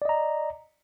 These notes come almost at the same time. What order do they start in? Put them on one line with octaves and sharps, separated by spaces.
D5 D#5 A#5